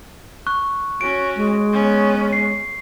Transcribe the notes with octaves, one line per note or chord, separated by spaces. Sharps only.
C#6 F#6
C#4 F#4 D7
G#3
B3 C#4
C7